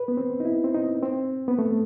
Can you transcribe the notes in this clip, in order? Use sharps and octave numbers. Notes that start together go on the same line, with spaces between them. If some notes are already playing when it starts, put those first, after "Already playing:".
Already playing: B4
B3
C4
D#4
E4
C4
D#4
C4
B3
A3